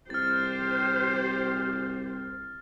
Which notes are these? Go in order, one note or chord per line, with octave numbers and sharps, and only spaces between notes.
C2 G4 C5 F6 A6